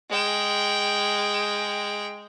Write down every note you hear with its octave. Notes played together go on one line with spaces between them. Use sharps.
G#3 G5